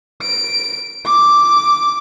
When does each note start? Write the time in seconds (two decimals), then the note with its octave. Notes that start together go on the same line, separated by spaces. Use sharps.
0.22 D7
1.06 D6